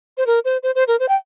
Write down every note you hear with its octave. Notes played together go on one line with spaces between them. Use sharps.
C5
A#4
C5
C5
C5
A#4
C5
G5